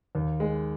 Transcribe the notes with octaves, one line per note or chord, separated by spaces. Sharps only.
D#2
G#3